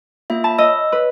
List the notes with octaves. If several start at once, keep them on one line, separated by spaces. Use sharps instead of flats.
A#3 F4 E5
A5 B5
D#5 E6
B4